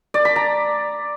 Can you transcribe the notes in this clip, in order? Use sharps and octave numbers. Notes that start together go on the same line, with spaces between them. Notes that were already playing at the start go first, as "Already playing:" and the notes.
D5
B5
A#5